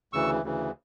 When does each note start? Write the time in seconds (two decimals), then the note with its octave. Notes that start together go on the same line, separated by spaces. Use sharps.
0.13 D2 C#3 E3 C#6 E6
0.42 D2 C#3 E3